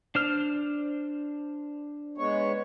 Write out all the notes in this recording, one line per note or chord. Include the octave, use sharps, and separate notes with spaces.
D4 C5 F6
G#3 B3 C#5